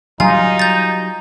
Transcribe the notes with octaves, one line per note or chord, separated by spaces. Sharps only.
F#3 G3 D#4 F4 G#5
G6 A6